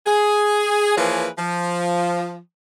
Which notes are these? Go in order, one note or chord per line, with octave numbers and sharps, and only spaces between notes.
G#4
E3 F3 A#3 G#4 B4 C#5
F3